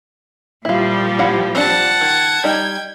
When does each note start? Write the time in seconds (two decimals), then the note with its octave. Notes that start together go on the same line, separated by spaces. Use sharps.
0.65 A#2 F3 G3 E4 F4
1.19 E4 F5 F#5
1.55 C4 D4 F#5 A5
2.01 D#3 G#6
2.44 G3 D#4 G5